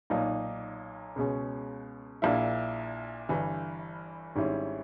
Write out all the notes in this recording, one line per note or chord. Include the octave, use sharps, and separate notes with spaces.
B1 A#2 A#3 D#4
C#2 B2 G#3 C#4
A#1 A#2 A#3 E4
G1 G2 E3
G#1 G#2 G3 C#4 E4